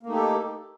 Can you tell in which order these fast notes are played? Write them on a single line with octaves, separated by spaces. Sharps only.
A#3 A3 D#4 G4 A4